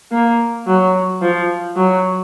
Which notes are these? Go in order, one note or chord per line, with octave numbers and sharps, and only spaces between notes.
A#3
F#3
F3
F#3